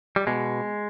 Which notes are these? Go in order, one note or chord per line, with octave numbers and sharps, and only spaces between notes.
G3
B2 G#3